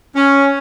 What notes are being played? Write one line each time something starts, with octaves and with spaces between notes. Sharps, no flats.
C#4